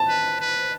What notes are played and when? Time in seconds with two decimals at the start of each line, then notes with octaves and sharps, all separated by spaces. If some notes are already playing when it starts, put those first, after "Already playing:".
Already playing: A5
0.08 B4
0.40 B4